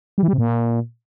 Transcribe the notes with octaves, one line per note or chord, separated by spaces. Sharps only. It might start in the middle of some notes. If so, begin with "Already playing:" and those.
G3
E3
G3
C3
A#2